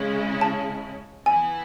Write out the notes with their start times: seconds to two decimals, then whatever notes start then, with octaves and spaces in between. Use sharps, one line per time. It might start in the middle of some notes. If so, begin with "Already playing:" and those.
Already playing: C#3 G#3 C#4 E4
0.41 A5
1.26 E3 B3 E4 G#5